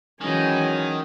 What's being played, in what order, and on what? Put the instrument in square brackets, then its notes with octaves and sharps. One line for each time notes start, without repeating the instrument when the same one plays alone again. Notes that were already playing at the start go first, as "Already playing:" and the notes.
[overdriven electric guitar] D#3 [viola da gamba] E3 C#4 [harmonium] F#3 G#3 [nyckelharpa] G#5